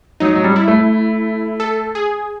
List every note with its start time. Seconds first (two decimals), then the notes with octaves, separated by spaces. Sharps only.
0.20 F#3 D#4
0.36 F#3
0.44 G3
0.56 E4
0.68 A3
1.60 A4
1.95 G#4